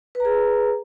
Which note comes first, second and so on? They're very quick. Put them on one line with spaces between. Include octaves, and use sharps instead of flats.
B4 A#5 G#4